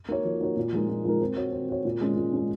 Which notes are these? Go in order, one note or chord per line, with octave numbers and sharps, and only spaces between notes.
A#3 D#4 F#4 C#5
F3
A#3 D#4 F#4 C#5
A#2
F3 G#3 D#4 A#4
A#2
F3 G#3 D#4 A#4
C4
F#4 C#5
C4
F#4 C#5
A#2
G#3 C#4
A#2
G#3 C#4